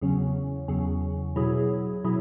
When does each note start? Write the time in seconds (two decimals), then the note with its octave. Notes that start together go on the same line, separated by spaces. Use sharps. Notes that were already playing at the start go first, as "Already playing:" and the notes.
0.01 E2 C#3 F#3 C#4
0.68 E2 C#3 F#3 C#4
1.36 B2 F#3 E4 G#4
2.04 B2 F#3 E4 G#4